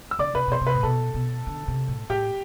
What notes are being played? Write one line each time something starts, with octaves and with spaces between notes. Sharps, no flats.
E6
D3 D5 D6
C3 B4 B5
B2 C5 C6
C3
B4 B5
A2
B2 A4 A5
B2
D3
C3
A2
A2 G4 G5